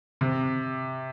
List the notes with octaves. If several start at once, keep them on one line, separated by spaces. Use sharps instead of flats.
C3